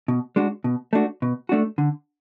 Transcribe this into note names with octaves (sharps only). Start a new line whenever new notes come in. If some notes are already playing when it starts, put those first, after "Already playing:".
B2
G#3 D4 F#4
B2
A3 D4 F#4
B2
A3 D4 F#4
D3